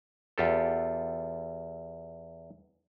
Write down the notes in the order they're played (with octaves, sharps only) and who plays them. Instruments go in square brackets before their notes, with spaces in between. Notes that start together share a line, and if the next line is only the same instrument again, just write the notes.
[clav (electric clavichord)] E2 F4 G4 A4